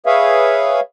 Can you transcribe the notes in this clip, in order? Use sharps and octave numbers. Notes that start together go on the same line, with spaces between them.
G#4 B4 C#5 E5 F5